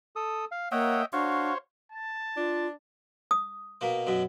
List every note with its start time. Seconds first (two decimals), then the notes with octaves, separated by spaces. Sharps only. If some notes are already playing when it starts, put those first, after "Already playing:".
0.16 A4 D#6
0.51 F5
0.72 A#3 C#5 D#5 E5 F#5 G5
1.13 D4 F#4 C5 C#5 F5
1.92 A5
2.37 D4 F4
3.31 D#6
3.81 B2 A#3
4.07 F#2 B2